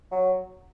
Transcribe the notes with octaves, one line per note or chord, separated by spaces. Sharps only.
F#3